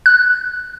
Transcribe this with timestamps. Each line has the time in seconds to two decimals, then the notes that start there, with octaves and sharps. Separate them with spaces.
0.06 F#6